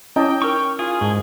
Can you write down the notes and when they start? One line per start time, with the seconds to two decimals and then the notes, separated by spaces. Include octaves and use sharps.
0.16 C#4 E4 D#5 G5 A5 D6
0.42 D#4 A#4 C#6 F6
0.79 F4 G#4
1.01 G#2 A5 C#6